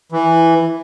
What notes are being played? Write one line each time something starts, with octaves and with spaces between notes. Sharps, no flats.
E3